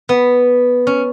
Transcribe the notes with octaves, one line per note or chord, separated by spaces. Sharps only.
B3
C#4